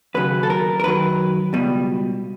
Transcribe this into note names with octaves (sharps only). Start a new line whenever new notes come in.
D#2 C#3 F#3 B4
A4
A#4
A#4
F#2 D#3 F#3 B4
C#2 B2 G3